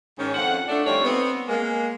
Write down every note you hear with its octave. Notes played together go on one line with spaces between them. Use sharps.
G#2 D#3 C#4
F2 F#5
A3 D4
F2 G3 A3 D#4 C#5
B3 C4
G#3 A#3